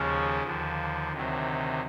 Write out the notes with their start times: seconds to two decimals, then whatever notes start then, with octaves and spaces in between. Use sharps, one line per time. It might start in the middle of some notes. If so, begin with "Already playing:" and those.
Already playing: D#2 C#3 F3 G#3 C#4
0.44 D#2 D3 F3
1.12 D2 C3 D#3 F#3